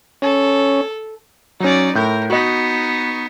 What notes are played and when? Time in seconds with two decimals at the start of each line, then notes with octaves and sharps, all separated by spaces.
0.22 C#4 A4
1.60 F#3 C#4 D#4 D5
1.95 A2 A#4 G6
2.30 B3 D#4 F#4 D#5